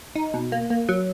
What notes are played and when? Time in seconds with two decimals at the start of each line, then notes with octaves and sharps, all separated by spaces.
0.16 D#4
0.34 B2
0.52 A#3
0.70 A#3
0.89 F#3